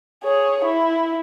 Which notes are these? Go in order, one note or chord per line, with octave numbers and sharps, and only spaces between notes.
G#4 C#5
E4